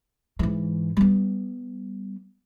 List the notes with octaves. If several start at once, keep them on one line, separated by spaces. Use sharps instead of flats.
G#2 E3
G3 B3